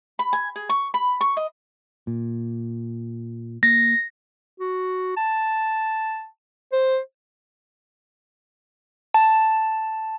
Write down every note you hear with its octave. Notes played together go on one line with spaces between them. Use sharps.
B5
G#5
G#4
C#6
B5
C#6
D#5
A#2
A#3 A#6
F#4
A5
C5
A5